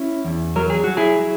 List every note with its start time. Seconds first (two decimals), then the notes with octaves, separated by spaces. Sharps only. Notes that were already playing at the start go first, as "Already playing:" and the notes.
Already playing: C#4 E4
0.25 E2
0.56 F#3 A#4
0.70 G#4
0.84 F#3 F#4
0.97 E4 G#4
1.19 F#3